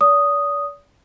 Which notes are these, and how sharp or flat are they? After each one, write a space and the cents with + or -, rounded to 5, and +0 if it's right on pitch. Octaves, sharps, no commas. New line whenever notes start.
D5 -45 D#6 +0